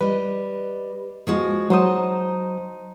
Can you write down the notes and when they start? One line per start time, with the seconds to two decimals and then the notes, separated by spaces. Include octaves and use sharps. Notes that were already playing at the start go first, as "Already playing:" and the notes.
0.01 G3 B4 D#5
1.27 F3 G#3 F#4
1.70 F#3 D#4 C5 A5 D#6